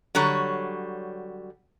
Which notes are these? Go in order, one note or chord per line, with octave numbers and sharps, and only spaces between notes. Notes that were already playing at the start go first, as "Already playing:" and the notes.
D3 F#3 G3 C#5